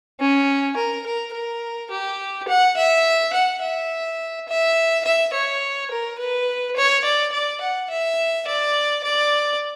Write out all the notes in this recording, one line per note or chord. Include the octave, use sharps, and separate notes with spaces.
C#4
A#4
A#4
A#4
G4
F#5
E5
F#5
E5
E5
E5
C#5
A#4
B4
C#5
D5
D5
F#5
E5
D5
D5